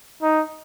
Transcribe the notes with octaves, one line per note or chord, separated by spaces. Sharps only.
D#4